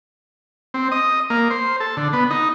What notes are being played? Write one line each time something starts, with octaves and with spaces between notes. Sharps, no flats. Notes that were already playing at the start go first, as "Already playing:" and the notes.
C4
D#5
A#3
C5
A4
D3
B3
D#4